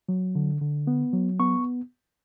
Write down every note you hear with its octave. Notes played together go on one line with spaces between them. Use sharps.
F#3
D3
D3
B3
F#3
B3 C#6